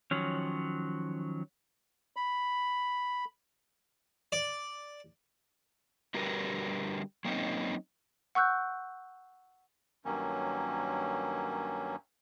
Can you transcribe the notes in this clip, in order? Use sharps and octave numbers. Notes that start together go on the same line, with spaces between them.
D#3 F3 F#3 C#4
B5
D5
D3 G3 F#4 G4 A#4 B4
F#3 A#3 C4 C#4 D#4
F#5 C#6 E6 F#6 G6
G2 D#3 F#3 A#3 C#4